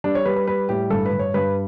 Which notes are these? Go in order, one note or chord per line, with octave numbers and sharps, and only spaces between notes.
G3 D4
C#5
G3 B4
B4
G3 B4
A2 G4
G2 A4
B4
G2
C#5
G2 B4